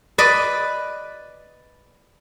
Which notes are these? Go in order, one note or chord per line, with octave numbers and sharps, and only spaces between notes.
B4 D5 D#5